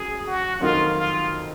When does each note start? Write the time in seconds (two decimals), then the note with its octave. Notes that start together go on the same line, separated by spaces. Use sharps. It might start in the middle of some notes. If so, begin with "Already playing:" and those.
Already playing: F#2 G#4
0.27 F#4
0.60 F2 D#3 F#3 A#3 D#4 F4
0.95 F4